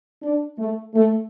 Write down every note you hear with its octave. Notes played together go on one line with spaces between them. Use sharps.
D4
A3
A3